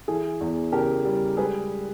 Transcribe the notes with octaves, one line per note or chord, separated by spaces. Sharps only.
E3 G#4
E2
C#3 G4 A#4
G3
G#3 G#4 B4